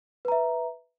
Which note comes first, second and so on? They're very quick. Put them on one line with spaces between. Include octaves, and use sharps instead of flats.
B4 A#5 E5